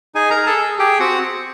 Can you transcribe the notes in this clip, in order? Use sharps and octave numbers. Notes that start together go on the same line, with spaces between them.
D#4 G#4 G#5
A#4 A#5
G#4
A4 A5
G#4
G4 G#4 G5
C4 F#4 F#5